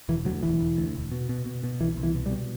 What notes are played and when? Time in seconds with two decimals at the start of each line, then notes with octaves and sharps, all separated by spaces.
0.09 E1 E3
0.25 D2 F#3
0.43 E1 E3
0.60 E1
0.77 D2
0.95 E1
1.11 B2
1.29 B2
1.46 B2
1.64 B2
1.80 C2 E3
1.97 C2
2.03 E3
2.15 B2
2.26 G3
2.31 B2